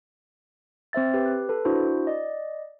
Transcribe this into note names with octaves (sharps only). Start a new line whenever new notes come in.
C4 C5 E5 A6
G4 B4
F#6
A4 B4
D4 E4 F#4 C5
D5 D#5